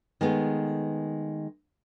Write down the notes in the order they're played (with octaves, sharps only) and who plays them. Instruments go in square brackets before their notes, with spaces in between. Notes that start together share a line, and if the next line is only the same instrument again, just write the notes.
[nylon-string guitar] D#3 G#3 A3 B3